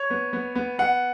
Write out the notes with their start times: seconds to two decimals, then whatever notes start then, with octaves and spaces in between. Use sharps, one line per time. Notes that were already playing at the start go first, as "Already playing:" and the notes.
Already playing: C#5
0.10 B3
0.33 B3
0.55 B3
0.79 B3 F#5